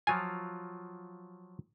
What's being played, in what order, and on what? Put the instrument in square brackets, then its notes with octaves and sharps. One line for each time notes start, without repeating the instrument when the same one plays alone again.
[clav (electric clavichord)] F3 F#3 F4 [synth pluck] G#5